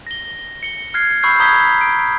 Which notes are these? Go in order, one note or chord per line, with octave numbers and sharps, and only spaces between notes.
A#6 G7
C#7 G7
F6 F#6 G#6 C7
B5 C#6 E6 G6 C7
A#5 D#6 G6 G#6 B6 G7
D7